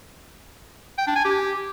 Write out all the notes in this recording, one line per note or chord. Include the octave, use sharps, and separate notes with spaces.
G5
D4
G#5
G4